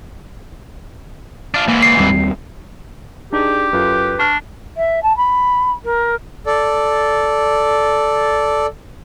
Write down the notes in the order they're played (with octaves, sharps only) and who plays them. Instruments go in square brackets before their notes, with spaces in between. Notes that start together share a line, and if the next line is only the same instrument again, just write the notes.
[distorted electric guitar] D4 F4
[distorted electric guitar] G#2 E3 [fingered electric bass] A#3
[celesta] C7
[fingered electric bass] D#2 G3 C4
[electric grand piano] D4 D#4 D5 [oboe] G4 [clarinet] G#4
[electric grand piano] F#2 F4 A4 [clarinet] B4
[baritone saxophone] D4 [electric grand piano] C#6 F6
[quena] E5
A5
B5
A#4
[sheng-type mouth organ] A4 D5